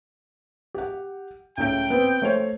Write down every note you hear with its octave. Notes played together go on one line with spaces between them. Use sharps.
G4 F#5
C#2 A2 G5 D7
B3 C4
A3 C5 C#5